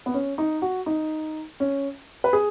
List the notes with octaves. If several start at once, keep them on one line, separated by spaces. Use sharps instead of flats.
B3
C#4
D#4
F#4
D#4
C#4
B4
G#4